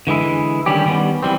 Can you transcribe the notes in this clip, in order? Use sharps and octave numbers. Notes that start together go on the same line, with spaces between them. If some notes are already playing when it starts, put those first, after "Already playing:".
D3 E3 G#3 E4
D3 D#3 G3 C#4 G4
D#3 G3 B3 C#4
E3 G3 C4